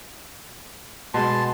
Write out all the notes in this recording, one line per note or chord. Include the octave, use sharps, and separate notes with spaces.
B2 G#3 A5 C6